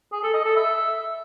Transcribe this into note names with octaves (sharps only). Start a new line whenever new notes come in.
G#4
A4
D#5
A4
E5